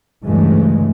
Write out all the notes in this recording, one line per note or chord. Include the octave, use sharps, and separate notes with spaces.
D2 G2 C#3 E3 G#3 A3